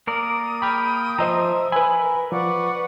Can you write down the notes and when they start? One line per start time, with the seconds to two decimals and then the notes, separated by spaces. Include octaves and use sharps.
0.07 A#3 A#4 D5 D#6
0.62 G5 B5 F6
1.18 F3 C5 D#5 E5 A#5
1.72 B4 G#5 B5
2.01 A#4
2.32 F3 B4 D5 F#5 C#6